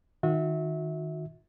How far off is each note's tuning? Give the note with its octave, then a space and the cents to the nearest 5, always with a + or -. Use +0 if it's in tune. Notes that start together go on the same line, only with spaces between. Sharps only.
D#3 +0 F#4 -35 E5 -25